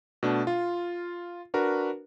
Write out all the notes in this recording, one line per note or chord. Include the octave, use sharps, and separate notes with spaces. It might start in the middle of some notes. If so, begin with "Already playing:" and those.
B2 A3 D4
F4
D4 F#4 A#4 B4